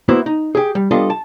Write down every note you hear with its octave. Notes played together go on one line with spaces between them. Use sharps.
A#3 B3 E4 F#4 C5
D#4
G4 G#4
G3
G3 B3 D4 F4 A4 D#5
A5